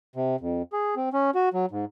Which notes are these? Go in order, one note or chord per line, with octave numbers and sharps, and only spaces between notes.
C3
F2
G#4
C4
C#4
F#4
F#3
G#2